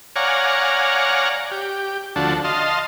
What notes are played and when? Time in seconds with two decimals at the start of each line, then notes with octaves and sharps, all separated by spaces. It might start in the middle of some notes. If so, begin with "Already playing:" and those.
0.16 C#5 D5 F5 F#5 G#5 A#5
1.51 G4
2.16 D2 F3 D4 F#4 A4
2.44 D#5 F5 A5 C6